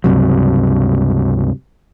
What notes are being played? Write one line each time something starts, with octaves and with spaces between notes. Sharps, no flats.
C#2 G2 C3 F#3